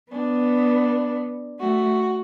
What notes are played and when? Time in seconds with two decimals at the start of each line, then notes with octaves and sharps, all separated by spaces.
0.12 B3 D4
1.60 A3 F#4